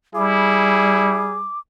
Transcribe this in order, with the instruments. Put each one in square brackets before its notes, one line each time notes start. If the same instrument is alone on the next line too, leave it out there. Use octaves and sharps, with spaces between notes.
[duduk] G3 [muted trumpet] E4 [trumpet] G#4 [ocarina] D6